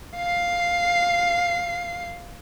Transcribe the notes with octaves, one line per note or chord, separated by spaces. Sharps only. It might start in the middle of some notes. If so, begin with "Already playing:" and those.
F5 C7